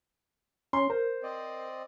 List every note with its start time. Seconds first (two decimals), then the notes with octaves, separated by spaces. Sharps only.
0.73 C#4 C6
0.90 A#4 C5
1.23 C4 D5 D#5